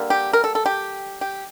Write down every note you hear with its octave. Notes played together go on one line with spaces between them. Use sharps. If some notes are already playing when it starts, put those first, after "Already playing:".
Already playing: D3 G3 A#3
G4
A#4
A4
A4
G4
G4